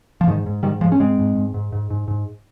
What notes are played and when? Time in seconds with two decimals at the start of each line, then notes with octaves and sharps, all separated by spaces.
0.21 F3
0.27 G#2 D#3
0.46 G#2
0.63 G#2 D#3 G3
0.81 G#2 F3 G#3
0.92 C#4
1.00 G#2 G#3 C4
1.19 G#2
1.36 G#2
1.54 G#2
1.72 G#2
1.91 G#2
2.08 G#2